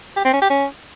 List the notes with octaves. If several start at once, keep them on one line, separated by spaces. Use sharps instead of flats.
G4
C4
C#4
G4
C#4